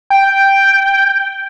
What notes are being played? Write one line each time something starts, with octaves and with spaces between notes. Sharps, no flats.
G5